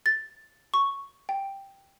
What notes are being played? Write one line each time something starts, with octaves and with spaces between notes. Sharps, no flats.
A6
C#6
G5